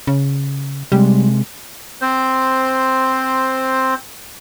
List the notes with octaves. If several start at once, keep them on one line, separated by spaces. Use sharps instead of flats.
C#3
C3 G3 G#3
C4 C5